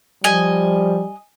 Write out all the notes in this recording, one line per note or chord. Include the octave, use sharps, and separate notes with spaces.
F3 G3 D#5 G#5